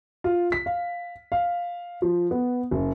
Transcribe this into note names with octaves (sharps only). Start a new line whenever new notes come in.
F4
B6
F5
F5
F3
B3
F#1